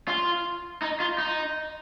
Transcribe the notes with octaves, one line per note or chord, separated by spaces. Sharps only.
F4
D#4
F4
D#4